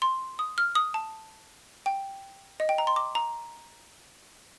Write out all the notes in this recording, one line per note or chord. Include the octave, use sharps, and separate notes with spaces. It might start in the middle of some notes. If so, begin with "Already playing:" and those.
C6
D#6
F6
D#6
A5
G5
D#5
G5
A#5
C6
D6
A#5